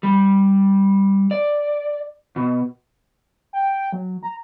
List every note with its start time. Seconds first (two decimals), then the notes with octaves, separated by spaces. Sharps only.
0.03 G3
1.31 D5
2.36 B2
3.53 G5
3.93 F#3
4.23 A#5